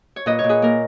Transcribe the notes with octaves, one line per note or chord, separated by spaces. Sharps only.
C#5
A#2 B4 D#5
C#5
A#2
G#4 B4
A#3 A#4